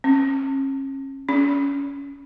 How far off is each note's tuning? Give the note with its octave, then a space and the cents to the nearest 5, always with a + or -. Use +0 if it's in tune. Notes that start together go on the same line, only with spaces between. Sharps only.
C#4 -35
C#4 +20